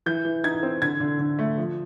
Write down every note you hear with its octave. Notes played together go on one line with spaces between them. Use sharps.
E3 G6
E3
D#4 G#6
C4
D3 G#6
D3
D3
A3
F3